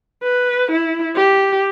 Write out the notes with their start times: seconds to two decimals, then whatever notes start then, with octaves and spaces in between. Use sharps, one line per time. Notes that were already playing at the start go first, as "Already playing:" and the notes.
0.23 B4
0.72 E4
1.16 G4